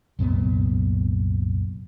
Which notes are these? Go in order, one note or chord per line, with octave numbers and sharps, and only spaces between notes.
C2 F#2 A#2 B3